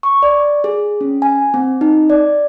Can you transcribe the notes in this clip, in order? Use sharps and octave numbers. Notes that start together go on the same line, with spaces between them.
C#6
D5
G#4
C#4
G#5
C4
D#4
D5